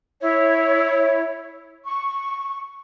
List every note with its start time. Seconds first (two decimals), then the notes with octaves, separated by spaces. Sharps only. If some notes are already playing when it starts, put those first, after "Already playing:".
0.21 E4 C#5
1.86 C#6